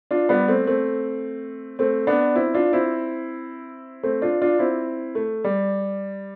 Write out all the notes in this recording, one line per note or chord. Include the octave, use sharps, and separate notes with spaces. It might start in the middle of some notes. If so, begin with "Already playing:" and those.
D4 F4
G3 B3
A3 C4
A3 C4
A3 C4
B3 D4
C4 E4
D4 F4
C4 E4
A3 C4
D4 F4
D4 F4
C4 E4
A3
G3